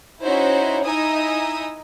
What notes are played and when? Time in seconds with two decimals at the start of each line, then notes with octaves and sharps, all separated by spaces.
0.24 C#4 D#4 E4 F#4 C5 C#5
0.85 D#4 E4 D#5 G#5 D#6 E6